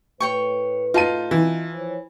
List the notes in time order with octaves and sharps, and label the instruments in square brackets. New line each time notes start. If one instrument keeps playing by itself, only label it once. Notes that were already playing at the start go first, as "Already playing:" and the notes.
[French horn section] A2 B4 [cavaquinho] C#5 G5 C#6
[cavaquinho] D#4 [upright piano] F4 A5 D#7
[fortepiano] E3
[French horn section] F3 C5 C#5